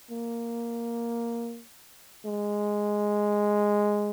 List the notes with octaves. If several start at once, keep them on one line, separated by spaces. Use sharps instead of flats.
A#3
G#3